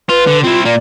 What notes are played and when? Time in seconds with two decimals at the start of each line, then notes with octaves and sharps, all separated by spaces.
0.09 F4 B4
0.27 D3
0.43 C4 E4 F4
0.65 A#2 A#3 D5